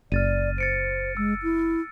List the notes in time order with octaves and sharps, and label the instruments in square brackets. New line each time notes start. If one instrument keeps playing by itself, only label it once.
[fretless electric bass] F#1 [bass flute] D5 [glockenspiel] F6 A6 D#7
[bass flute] C5 [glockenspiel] A6 C#7 D7
[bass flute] G#3 [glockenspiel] E6
[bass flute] E4